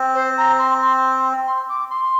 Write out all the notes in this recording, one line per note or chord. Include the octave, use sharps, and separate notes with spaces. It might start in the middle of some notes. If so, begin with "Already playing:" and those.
Already playing: C4
C5
A#5
C6
C6
C6
D6
C6